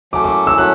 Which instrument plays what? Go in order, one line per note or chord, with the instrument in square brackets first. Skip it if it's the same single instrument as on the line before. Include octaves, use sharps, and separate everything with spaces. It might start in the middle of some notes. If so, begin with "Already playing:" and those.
[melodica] F#3 A3 C#4 [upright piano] D6
[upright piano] D6
E6
[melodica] F#3 A3 C#4 [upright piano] F#6